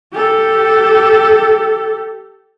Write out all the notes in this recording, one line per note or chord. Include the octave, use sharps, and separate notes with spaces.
G4 A4